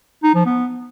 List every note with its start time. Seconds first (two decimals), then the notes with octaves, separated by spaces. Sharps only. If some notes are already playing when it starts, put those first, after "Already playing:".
0.23 D#4
0.35 F3
0.46 B3